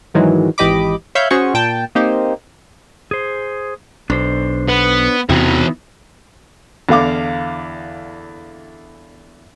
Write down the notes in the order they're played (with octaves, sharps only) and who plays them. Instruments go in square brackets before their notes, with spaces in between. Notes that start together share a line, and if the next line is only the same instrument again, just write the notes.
[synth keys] G#2 D#3 E3 F#3 G#3
G#1 E3 G4 D#5 B5 D6
C#5 E5 F5 B5 G6
C#4 F#4 G#4 C5 C#5 C#6
A#2 G5 A5
A#3 C4 D#4 G4 C5
[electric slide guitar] G#4 C5
[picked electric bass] B1 [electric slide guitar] D4 C5
[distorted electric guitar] B3
[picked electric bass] E2 C3 C4 [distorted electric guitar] E3 F#4 [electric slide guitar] B3 D#4 E4
[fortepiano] E2 D3 F5 D6